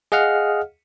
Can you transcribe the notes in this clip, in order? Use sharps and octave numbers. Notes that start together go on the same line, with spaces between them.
G#4 D#5 F5 F#5 F6